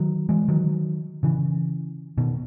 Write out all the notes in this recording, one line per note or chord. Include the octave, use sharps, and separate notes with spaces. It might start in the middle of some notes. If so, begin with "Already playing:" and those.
Already playing: D#3 F#3
E3 G#3
D#3 F#3
C#3 E3
B2 D#3